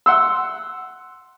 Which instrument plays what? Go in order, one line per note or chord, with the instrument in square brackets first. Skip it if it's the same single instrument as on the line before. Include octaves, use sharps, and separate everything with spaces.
[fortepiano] F#5 C6 E6